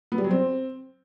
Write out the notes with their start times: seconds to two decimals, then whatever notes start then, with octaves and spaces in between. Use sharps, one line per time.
0.12 B3
0.18 G3
0.24 F#3
0.31 C4